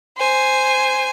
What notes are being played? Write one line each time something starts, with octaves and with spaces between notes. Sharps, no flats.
C5 G#5